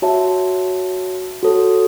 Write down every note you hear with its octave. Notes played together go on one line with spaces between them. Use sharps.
F#4 C#5 E5 A5
F#4 A4 C#5